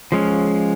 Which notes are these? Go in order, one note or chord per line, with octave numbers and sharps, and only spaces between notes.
F3 G#3 C#4